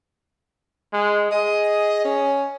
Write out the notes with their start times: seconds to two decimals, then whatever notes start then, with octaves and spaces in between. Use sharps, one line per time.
0.93 G#3
1.31 G#4 D#5
2.05 C#4